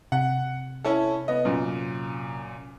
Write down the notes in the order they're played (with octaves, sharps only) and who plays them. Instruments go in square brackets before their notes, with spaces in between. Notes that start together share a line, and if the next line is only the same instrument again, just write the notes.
[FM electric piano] C3 [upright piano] F#5
[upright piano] C#4 E4 A4
B3 D#5
F#2 A#2